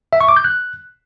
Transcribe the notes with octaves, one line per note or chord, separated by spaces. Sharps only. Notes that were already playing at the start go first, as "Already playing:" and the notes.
E5
C#6
D6
G6
F#6